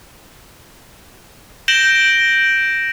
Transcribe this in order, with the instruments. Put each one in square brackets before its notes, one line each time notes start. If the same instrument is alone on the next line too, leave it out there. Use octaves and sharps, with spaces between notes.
[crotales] G6 A#6 D7 E7 F#7 G7